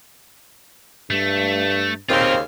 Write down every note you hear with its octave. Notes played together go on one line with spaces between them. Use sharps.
G2 A3
D#2 C#3 C4 F4 A#4 F5